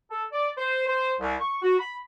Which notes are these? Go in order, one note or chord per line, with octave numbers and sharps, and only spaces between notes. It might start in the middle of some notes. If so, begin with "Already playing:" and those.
A4
D5
C5
C5
C2
C#6
F#4
B5